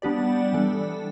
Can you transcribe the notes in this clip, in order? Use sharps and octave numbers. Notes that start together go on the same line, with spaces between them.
G3 B3 D4 G4 D5
E3 G3 D4 A4